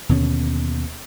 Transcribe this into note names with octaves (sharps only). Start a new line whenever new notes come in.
D#2 B2 D3 C#4